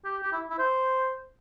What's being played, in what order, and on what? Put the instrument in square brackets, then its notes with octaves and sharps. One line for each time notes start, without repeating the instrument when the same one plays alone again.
[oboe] G4
G4
E4
E4
C5